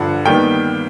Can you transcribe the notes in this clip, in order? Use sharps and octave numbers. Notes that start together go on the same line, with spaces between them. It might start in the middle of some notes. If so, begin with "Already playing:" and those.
Already playing: G2 D3 F3 F#5
D#2 D#3 G3 B3 G5